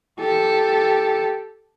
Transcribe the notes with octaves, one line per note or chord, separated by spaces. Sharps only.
G4 A4